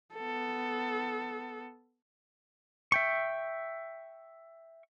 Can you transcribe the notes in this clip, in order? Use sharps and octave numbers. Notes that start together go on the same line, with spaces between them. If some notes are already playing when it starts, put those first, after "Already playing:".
B3 A4
E5 G5 C#6